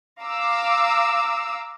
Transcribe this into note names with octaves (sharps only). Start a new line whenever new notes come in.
F5 A#5 D6 E6